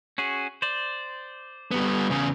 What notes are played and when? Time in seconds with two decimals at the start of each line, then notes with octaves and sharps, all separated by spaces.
0.18 C#4 F#4 G#4
0.62 C5 D5
1.71 G3 B3
2.10 E2 C#3